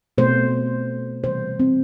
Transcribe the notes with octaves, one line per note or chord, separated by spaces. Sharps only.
B2 A3 C5
C3 E3 G3 C5
C4